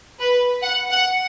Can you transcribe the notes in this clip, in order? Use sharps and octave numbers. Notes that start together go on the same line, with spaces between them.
B4
F#5
F#5